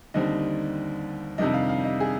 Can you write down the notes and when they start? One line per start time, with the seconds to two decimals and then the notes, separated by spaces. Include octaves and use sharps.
0.14 D#2 D3 G3 C4 D#4 D#5
1.38 F2 C3 D#3 G3 D4 D#5
1.53 F5
1.69 F5
1.84 D#5
2.00 G#4